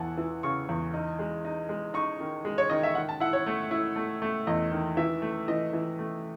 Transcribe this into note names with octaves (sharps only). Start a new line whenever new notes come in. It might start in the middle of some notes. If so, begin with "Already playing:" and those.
Already playing: E2 E3 F#5 G#5 A5
E3
C#3 C#6
E2
D#4
G#3
D#4
G#3
D#4 C#6
D#3
G#3
C#5
D#3 D#5
E5
D#3 F#5
A5
E4 F#5
C#5
A3
E4
A3
A3
E2 D#5
D#3
E3 E5
A3
E3 D#5
E3
A3